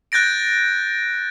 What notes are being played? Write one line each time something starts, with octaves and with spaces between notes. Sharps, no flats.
F#6 G6 A6 A#6 D7